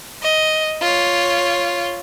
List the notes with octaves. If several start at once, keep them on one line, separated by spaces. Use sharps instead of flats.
D#5
F4 C#5